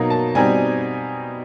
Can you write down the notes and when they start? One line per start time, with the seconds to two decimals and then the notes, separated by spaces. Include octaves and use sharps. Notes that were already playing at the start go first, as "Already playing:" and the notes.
Already playing: B2 F#3 A#3 D#4
0.10 A5
0.35 B2 G3 C4 D#4 G#5